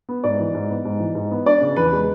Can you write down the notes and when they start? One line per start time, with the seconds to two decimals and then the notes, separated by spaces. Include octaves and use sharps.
0.09 B3
0.24 G#2 D5
0.40 E3
0.54 G#2
0.70 B3
0.85 G#2
1.00 E3
1.15 G#2
1.31 B3
1.46 D4 D5
1.61 C#3
1.76 E2 B4
1.93 G#3